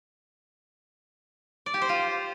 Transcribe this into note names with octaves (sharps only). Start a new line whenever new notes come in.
D5
G4
C5
F4